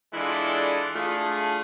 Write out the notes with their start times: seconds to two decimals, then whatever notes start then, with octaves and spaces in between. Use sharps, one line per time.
0.14 E3 G#3 D4 E4 F4 A4
0.95 A3 D4 E4 F4 G#4